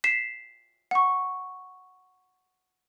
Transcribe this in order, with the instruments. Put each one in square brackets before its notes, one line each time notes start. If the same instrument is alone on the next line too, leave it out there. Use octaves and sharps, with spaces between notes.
[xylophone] B6 C7 E7
F#5 C#6